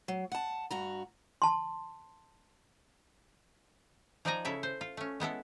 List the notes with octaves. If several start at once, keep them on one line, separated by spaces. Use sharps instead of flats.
F#3
F#5 A5
G2 F#4 A#5
A5 C6
F3 D#4 D5 D#5 G#5 A#5
C#3 E4 A4 C#5 E5
C5
F4
A3 C#4
G#3 B3 E4 A4